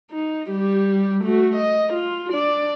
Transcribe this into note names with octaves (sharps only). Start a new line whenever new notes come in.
D#4
G3 G4
A3 F#4
D#5
F4
D4 D5